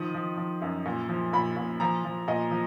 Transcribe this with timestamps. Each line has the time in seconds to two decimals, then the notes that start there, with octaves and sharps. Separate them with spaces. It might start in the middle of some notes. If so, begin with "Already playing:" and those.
Already playing: D#3 F3 D#6
0.14 F3
0.37 F3
0.62 F#2
0.86 A#2
1.09 F3
1.33 A#2 B5
1.57 A#2
1.80 F3 A#5
2.04 F3
2.28 A#2 D#5
2.51 F3